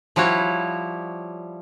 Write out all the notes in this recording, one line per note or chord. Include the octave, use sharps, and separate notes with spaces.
F3 G3 E4 F#4 C#5